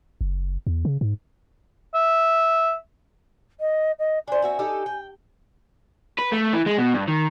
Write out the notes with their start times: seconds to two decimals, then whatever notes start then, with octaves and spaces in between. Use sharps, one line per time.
0.21 F#1
0.67 E2
0.85 C#3
1.01 G#2
1.94 E5
3.60 D#5
3.99 D#5
4.28 D4 C5 G#5
4.42 C4 F#4 E5
4.59 D#4 G4 A4
4.86 G5
6.19 B4
6.32 A3
6.54 E3
6.66 G#3
6.78 B2
6.94 G2
7.08 D#3